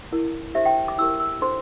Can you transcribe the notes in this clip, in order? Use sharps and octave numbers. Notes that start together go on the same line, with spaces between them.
E4 A#4
D4 G4 C5 E5
G5
D6
E4 G4 A#4 E6
E6
D4 A4 C5 C6